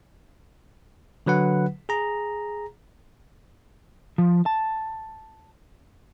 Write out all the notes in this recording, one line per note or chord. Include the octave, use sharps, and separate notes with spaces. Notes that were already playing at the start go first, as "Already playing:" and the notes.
D3 F#3 B4 F#5
G#4 A#5
F3
A5